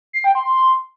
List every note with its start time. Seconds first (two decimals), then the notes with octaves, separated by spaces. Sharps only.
0.13 C7
0.24 G5
0.35 C6